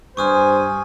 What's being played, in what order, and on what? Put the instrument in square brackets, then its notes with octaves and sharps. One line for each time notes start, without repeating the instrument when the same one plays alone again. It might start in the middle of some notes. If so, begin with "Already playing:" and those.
[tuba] G2 [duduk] C5 [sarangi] G#5 [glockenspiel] C#6 D#6 F6